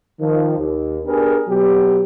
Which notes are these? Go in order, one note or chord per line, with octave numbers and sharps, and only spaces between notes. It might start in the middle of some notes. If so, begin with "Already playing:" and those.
D#3 F3
D#2
B3 D4 G4 G#4 A#4 B4
B2 F#3 B3 G4